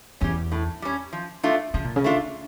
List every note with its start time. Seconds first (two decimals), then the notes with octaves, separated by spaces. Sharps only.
0.21 E2 G3 C#4
0.52 A2
0.82 G3 C#4
1.13 F3
1.43 A3 D4 F4
1.74 C#3 F3
1.84 A#2
1.96 C#3
2.04 A3 D4 F4